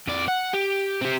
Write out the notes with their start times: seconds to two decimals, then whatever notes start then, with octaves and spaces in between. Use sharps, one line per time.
0.08 F2 D5
0.28 F#5
0.54 G4
1.02 C4 G4